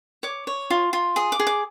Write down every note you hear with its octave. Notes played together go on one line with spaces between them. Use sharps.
C#5 D6
C#5
F4
F4
G#4 D#6
D6
G#4
D6